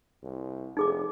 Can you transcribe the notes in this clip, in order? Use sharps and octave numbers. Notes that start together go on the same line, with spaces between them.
C2
F1 D#4 G#4 D6